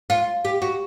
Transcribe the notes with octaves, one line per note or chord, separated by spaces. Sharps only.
F4
G4
F#4